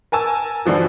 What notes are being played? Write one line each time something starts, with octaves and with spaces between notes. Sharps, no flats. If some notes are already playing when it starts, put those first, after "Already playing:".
A#4 G#5 A5 E6
G2 D3 E3 F3 F#4